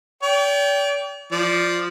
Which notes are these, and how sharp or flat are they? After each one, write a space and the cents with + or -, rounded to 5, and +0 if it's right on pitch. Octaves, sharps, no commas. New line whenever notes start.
D5 -45 G5 +0
F3 +0 D5 +0